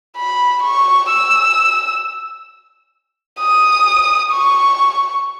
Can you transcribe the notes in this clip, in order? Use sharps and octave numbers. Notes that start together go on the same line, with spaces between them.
B5
C#6
E6
D#6
C#6